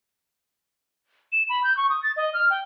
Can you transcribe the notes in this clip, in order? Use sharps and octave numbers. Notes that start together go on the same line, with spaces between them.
E7
B5
G6
C#6
D#6
A6
D#5
F6
G5